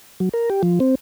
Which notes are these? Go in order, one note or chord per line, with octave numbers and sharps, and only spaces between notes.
F#3
A#4
G4
F3
C4